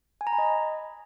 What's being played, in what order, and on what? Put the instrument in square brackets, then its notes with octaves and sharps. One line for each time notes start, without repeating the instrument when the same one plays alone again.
[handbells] G#5
A#5
B5
D#5